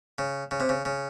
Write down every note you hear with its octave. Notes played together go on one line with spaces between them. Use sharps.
C#3
C#3
C3
C#3
C#3